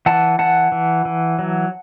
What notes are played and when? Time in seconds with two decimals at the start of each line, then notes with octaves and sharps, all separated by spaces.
0.06 E3 F#5 A5
0.39 E3 F#5 A5
0.72 E3
1.05 E3
1.39 F#3